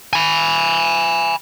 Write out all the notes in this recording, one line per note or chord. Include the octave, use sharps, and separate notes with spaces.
G#5 B5